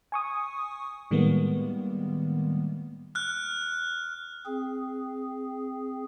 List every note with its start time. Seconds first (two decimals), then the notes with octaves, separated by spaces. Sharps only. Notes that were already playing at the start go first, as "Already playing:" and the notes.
0.12 G#5 C#6 D#6
1.11 A2 D#3 G3 G#3 A#3 B3
3.15 F6 F#6
4.46 C4 G#4